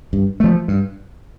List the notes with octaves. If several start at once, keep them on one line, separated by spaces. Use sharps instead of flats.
G2
F3 A3
G2